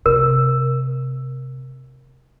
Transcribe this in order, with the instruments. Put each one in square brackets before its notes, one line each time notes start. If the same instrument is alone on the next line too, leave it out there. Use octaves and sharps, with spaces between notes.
[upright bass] C3 [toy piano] A#4